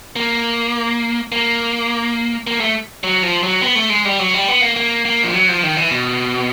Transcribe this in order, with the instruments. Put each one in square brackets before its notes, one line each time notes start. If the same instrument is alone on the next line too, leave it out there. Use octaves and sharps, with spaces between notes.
[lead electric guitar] A#3
A#3
A#3
A3
F#3
F3
F#3
B3
A3
G#3
G3
F#3
G3
B3
A#3
A#3
A#3
F3
F#3
F3
D#3
E3
B2